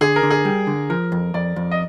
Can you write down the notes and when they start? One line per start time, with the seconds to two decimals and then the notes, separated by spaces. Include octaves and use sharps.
0.01 D3 G#4
0.16 A#4
0.23 D3
0.30 G#4
0.45 G3
0.67 D3
0.90 F3 A#4
1.12 F2
1.34 F2 D5
1.56 F2
1.71 D#5